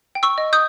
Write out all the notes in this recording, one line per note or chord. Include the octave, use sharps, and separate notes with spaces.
G5
C#6 E6
D#5
D#6 G6